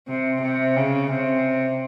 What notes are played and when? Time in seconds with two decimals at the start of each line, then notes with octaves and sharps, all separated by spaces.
0.08 C3
0.42 C3
0.76 C#3
1.11 C3